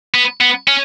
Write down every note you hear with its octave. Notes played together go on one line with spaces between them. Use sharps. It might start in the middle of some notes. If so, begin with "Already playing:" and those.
B3
B3
C#4